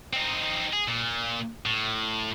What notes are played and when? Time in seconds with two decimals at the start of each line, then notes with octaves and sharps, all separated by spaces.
0.13 C4 D#4
0.73 G#4
0.88 A#2
1.66 A2